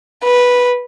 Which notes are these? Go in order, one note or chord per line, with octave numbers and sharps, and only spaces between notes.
B4